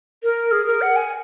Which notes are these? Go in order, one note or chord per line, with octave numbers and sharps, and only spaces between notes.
A#4
G#4
A#4
F#5
G#5